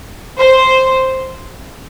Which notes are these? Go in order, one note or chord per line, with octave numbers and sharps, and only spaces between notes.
C5